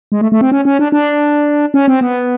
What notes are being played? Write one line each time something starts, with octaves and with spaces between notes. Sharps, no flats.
G#3
A3
A3
C4
C#4
C#4
D4
D4
C#4
C4
B3